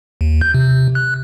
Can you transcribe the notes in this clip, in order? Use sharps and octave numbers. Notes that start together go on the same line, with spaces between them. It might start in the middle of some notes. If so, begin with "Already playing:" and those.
D#2
G6
C3
F#6